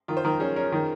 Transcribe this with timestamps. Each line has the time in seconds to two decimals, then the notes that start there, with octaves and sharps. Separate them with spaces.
0.08 D#3 F4
0.17 C5
0.24 D#3 A#4
0.40 C#4 G#4
0.56 C#4 A#4
0.72 D#3